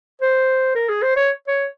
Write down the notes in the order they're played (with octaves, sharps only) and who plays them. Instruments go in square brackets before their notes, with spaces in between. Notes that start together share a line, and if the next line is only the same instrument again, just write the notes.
[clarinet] C5
A#4
G#4
C5
C#5
C#5